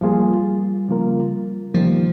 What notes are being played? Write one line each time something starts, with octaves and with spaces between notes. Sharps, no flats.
F3 G3 A#3 F4 G#4
C#3 F3 A#3 F4 A#4
C3 D#3 F3 G3 A#3